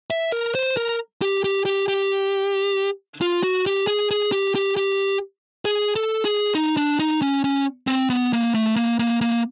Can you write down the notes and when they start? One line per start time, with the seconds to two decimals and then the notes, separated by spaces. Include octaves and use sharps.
0.10 E5
0.32 A#4
0.55 C5
0.77 A#4
1.22 G4
1.44 G4
1.65 G4
1.88 G4
3.21 F4
3.43 F#4
3.66 G4
3.87 G#4
4.11 G#4
4.32 G4
4.55 G4
4.77 G4
5.65 G#4
5.96 A4
6.25 G#4
6.55 D#4
6.77 D4
6.99 D#4
7.22 C#4
7.44 C#4
7.87 C4
8.10 B3
8.33 A#3
8.54 A3
8.76 A#3
8.99 A#3
9.21 A#3